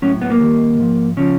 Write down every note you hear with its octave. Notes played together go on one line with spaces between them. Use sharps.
A2 F#3 C#4
B3
A#3
D#2 D#3 G3
G#2 F3
C#3 F3 C#4